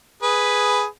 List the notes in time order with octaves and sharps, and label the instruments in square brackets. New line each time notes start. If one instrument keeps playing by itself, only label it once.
[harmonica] G#4 B4